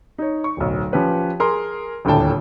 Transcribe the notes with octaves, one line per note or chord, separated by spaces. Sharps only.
D#4 C#5
C#6
D1 B1
F3 C#4 G4 B4 C#5
G#4 A#4 C6
D#1 D2 A2 D3 G5 A5